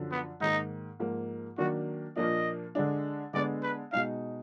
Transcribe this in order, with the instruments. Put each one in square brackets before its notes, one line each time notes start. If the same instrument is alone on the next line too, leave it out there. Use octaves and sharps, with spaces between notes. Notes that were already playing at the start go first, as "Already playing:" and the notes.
Already playing: [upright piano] F#2 D3 F3
[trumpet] B3
[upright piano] G#2 D#3 A#3 [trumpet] D#4
[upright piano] G#2 F3 A#3
[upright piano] D#3 F#3 A#3 D4 [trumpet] F#4
[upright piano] A#2 F3 A#3 D4 [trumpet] D#5
[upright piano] D3 G#3 D4
[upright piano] D3 G#3 B3 D4 [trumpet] D5
[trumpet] B4
[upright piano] B2 G#3 D#4 [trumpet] F5